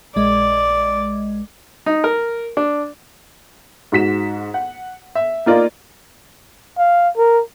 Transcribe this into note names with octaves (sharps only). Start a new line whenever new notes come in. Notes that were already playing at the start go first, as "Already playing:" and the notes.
A#1 G#3 D5 D#5
D#4
A#4
D4
G#2 F#4 B6 E7
F#5
E5
A#3 D#4 F4 A#4 D5 D#5
F5
A#4